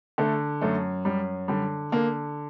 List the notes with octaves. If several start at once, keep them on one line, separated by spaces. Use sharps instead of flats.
D3 A3
F#2 A3
F#2 G3
D3 G3
D3 A#3